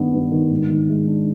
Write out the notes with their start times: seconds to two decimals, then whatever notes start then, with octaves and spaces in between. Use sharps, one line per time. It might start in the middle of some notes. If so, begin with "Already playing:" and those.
Already playing: G2 D#3 B3 D4
0.13 G2
0.32 D#3
0.50 G#2
0.69 D#3
0.89 G#3
1.07 D4